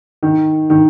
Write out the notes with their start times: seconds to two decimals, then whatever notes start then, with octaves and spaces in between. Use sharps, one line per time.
0.23 D#3
0.70 D#3